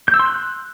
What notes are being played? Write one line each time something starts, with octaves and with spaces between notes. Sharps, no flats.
G6
E6
C6
F#6